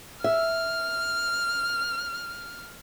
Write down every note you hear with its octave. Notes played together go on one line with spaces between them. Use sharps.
E5 F6